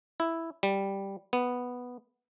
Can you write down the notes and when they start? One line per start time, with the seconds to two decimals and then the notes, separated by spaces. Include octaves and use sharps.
0.20 E4
0.63 G3
1.33 B3